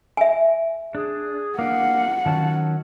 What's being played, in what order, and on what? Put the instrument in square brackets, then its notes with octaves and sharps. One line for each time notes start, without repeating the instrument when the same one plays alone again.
[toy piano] E5 G#5
[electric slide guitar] D4 [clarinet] G#4
[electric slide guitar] A#3 D4 [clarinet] F5 [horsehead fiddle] F#5
[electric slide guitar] D#3 F#3 C#4 [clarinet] A5